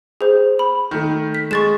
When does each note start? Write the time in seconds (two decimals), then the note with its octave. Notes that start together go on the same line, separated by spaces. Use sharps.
0.21 G#4 C5
0.59 B5
0.91 D#3 A3
1.35 B6
1.51 G#3 C#6 A6 E7